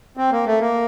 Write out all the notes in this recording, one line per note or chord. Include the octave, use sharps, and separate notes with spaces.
C4
A#3
A3
A#3